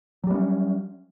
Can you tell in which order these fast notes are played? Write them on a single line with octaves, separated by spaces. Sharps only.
F#3 G3 B3 C#4